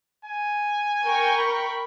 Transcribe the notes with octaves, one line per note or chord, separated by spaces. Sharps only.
G#5
A#4 G5 C#6
B5